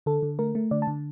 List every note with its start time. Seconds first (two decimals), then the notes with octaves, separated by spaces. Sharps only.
0.06 D3 A4
0.23 D3
0.39 A3 A#4
0.55 A3
0.71 D3 D5
0.82 A5
0.87 D3